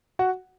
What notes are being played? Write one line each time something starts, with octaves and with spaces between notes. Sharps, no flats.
F#4 F#5